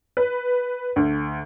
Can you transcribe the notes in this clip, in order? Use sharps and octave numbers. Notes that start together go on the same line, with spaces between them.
B4
D2